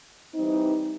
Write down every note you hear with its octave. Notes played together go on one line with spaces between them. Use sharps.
E3 G3 C4 D#4